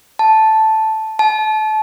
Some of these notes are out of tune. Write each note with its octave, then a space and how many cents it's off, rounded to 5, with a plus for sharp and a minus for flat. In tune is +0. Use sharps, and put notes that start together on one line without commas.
A5 -5
A5 -30